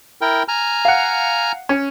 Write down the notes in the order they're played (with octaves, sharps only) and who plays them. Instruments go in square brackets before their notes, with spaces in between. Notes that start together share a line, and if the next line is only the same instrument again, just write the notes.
[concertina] E4 A#4 G5
G#5 A#5 F6
[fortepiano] F5 F#5
C#4